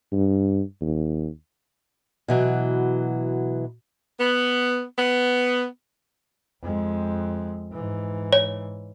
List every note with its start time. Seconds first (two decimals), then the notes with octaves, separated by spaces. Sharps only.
0.13 G2
0.81 D#2
2.28 B2 E3 F#3
4.19 B3
4.97 B3
6.61 F2 G#3
7.72 G#2 E3
8.33 C#5